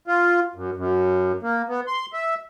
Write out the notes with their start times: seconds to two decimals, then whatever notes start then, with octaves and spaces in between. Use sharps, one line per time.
0.07 F4
0.56 F#2
0.77 F#2
1.43 A#3
1.69 B3
1.87 C6
2.13 E5